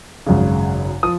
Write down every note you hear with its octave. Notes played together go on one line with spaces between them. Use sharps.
G#1 F#2 C#3
F3 D#6